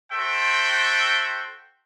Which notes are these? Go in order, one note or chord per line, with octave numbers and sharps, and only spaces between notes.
F#4 A4 C5 E5 G5